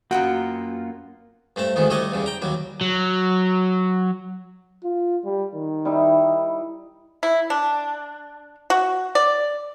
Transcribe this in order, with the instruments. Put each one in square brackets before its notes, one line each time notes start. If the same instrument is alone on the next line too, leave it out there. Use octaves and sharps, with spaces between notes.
[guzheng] F#2 B3 G5 [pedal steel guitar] A#3 F4 [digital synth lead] F#4 [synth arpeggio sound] F#5
[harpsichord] G2 A3 C4 A5
D2 G#2 D#3 E3 B3
G3 A3 A4 C#5 D#5 F#5
E2 C#3 G3
G5 A#5
D#2 F#3 G3
[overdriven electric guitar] F#3
[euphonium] F4
G3
D#3
[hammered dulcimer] G3 D#4 E4
[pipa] E4
D4
F#4
D5